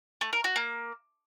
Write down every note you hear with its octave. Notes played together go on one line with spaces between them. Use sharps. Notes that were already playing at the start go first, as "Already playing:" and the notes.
A3
A#4
F#4
A#3